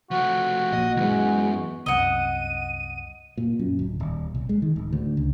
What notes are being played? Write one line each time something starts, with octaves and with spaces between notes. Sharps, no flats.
F3 A3 F#4
A#1 A#2 D#5
C2 F#2 E3 G#3 B3
C2 F#2 D#5 F#5 D#7
A#2
F#2
D1
D#1
B1
G#3
D#3
D1
D2
C#2